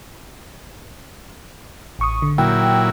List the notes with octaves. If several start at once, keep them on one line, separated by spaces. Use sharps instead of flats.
A1 C#6 D#6
D3
A#2 F#3 E4 G5